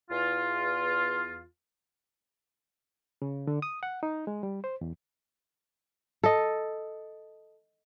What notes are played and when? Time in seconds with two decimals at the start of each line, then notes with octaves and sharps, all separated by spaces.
0.11 E2 F4
3.22 C#3
3.47 D3
3.62 D#6
3.83 F#5
4.03 D#4
4.27 G#3
4.43 G3
4.64 C5
4.81 E2
6.24 A4 D#5